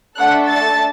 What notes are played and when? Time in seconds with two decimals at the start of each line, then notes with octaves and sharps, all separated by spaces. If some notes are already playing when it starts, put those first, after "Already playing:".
0.18 A3 D4 A4 F#5 F#6
0.49 A5 A6